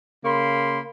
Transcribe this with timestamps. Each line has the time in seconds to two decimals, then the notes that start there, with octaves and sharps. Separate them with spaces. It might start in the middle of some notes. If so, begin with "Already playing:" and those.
0.25 C#3 A#3 B5 C6